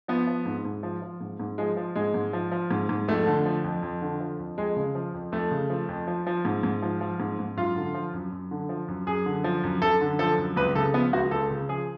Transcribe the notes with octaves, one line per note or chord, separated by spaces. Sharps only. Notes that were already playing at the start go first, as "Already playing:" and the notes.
F3 B3
F3
G#2
G#2
F3
F3
G#2
G#2
F3 G#3
F3
G#2 G#3
G#2
F3
F3
G#2
G#2
F2 A3
D3
F3
F2
F2
D3
F3
F2
F2 G#3
C#3
F3
F2
F2 A3
C#3
F3
F2
F3
F3
G#2
G#2
F3
F3
G#2
G#2
F#2 F4
D3
F3
F#2
F#2
D3
F3
F#2
F#2 G#4
D3
F3
F#2
F#2 A4
D3
F3 A4
F#2
C#2 B4
C#3 A4
F3 B3
C#2 F#4
C#2 A4
C#3
F3 G#4